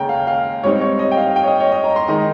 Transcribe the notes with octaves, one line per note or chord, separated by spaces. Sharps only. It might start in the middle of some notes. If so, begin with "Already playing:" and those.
Already playing: D#2 C#3 G#3 G5 A#5
F5
F5
G#2 G3 C4 D#4 C#5
C#5
D#5
G5
F5
G5
C#5
D#5
C#5
D#5
A#5
C6
D#3 G#3 D#4 A#5